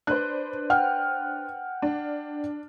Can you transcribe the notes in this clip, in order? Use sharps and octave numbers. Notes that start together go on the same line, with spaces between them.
D4 B4 C5 F#6
F#5 G5 F6
D4